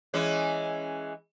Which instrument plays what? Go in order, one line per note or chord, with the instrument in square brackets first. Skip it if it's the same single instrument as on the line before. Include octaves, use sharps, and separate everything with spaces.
[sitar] E3 G#3 C#4